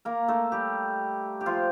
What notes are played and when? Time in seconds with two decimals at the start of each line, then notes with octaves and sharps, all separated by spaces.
0.05 A#3 A#4
0.28 A3 A4
0.52 G3 G4
1.41 G4
1.46 F3 F4